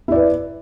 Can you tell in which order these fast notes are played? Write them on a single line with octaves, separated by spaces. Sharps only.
E4 D5 B4